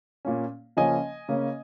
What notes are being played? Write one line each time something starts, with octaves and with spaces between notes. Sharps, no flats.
A#2 A#3 C#4
C#3 F3 A#3 C#4 D#5 G#5
C#3 A#3 C#4